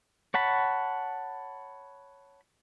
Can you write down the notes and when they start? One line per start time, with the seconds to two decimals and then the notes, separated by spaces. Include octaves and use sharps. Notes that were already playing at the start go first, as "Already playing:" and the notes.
0.34 C#5 F#5 A5 B5